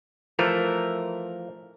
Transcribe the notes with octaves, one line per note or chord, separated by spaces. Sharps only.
E3 F3 A3 A#4